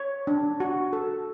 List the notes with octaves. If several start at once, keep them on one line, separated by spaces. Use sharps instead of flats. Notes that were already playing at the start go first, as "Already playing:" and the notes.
Already playing: C#5
D4
F#4
A4